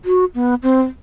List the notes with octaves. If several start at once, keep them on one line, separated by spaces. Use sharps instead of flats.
F#4
B3
C4